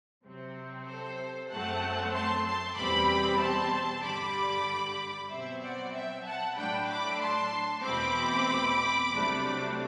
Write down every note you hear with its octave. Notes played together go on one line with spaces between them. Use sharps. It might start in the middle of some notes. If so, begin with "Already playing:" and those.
C3 F#3 C4
A4 C5
F#2 F#3 A3 C4 F#5 A5
A5 C6
A5 C6
E2 B2 G3 C4 B5 D6
A5 C6
G2 D3 G3 B5 D6
B2 F#3 C4 C5 E5
D5 F#5
E5 G5
F#5 A5
A2 F#3 A3 D4 G5 B5
B5 D6
A5 C6
E2 B2 A3 C4 B5 D6
C2 C3 F#3 A3 D4